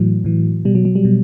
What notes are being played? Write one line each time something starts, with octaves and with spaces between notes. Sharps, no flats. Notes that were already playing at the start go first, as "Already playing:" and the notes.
Already playing: A2 E3 F#3
A2 E3
B2 G3
F#3
F#3
G3
B2